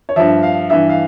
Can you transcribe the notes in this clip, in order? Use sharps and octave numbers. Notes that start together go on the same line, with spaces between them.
C#5
G2 F3 E5
F5
G2 E3 E5
F5